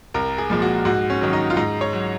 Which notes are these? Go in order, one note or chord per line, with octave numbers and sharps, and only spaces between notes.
C2 A#4
G#4
A#2 F3 G#3
F#4
G#2 F#4
C#4
D#3 F#3
D#4
F4
G#2 D#4
C#5
F#3